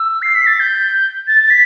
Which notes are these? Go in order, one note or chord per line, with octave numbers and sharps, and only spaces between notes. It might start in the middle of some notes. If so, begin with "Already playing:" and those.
Already playing: E6
C7
B6
A6
G6
A6
A6
B6